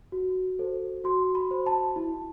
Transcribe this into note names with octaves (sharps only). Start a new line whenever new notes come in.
F#4
A4 C5
F#4 C6
B5
C5
A5
E4